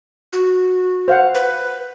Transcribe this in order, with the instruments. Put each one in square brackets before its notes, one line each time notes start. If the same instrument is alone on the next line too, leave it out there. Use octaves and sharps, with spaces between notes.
[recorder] F#4
[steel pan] C5 F5 F#5
[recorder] B4